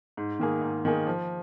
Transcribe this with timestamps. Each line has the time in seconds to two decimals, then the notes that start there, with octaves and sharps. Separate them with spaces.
0.17 G#2
0.39 D#3 A#3 G#4
0.62 G#2
0.85 D#3 A#3 G#4
1.07 F3